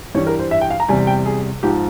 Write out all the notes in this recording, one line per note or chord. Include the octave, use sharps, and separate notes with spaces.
G2 E3 G3 C#5
A#4
C5
E5
G5
F5
A#5
E2 C3 G3 G#5
G5
G#4
G#2 F3 G4